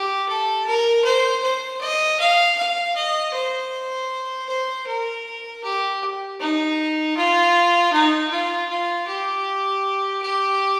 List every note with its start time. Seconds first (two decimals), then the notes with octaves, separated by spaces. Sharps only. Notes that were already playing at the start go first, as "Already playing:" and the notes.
Already playing: G4
0.28 A4
0.66 A#4
1.05 C5
1.43 C5
1.81 D#5
2.20 F5
2.58 F5
2.96 D#5
3.34 C5
4.49 C5
4.87 A#4
5.64 G4
6.40 D#4
7.17 F4
7.93 D#4
8.31 F4
8.70 F4
9.08 G4
10.22 G4